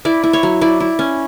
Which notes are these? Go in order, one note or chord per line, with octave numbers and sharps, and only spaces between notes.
E4 D5
E4
C#5
F#3
E4 D5
E4
C#4